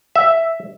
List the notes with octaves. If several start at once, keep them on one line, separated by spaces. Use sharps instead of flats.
E5